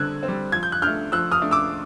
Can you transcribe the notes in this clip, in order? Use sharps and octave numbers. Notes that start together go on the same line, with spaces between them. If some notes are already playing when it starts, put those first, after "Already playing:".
Already playing: D3 G3 C4 E6 F#6 G#6
C4
G3
F3 G#6
G6
F#6
A3 D4 F6 G6
F3 E6 F#6
D#6 F6
A3 D4
D6 E6